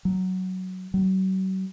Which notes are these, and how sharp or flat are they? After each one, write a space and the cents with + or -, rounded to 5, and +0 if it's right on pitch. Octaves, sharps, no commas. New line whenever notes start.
F#3 +5
F#3 +40